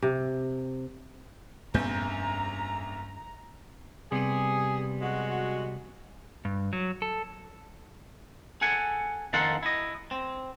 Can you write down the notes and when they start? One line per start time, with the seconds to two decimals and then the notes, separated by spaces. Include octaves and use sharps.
0.02 C3
1.74 F1 A#1 G2 B3 C#4 A#5 G6
4.12 C3 G3 B3 G#4
5.01 G#3 F#4
6.45 G2
6.73 F#3
7.02 A4
8.61 G#4 A4 F#5 G#5
9.33 F2 D#3 A#3 F4 A4 F#5
9.63 E4 D#5
10.11 C4